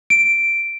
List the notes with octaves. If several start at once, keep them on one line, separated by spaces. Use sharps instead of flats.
D7